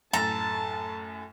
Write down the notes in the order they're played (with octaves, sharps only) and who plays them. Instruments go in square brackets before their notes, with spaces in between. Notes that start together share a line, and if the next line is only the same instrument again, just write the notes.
[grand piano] F#2 A2 [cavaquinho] A4 A#5 [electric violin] A5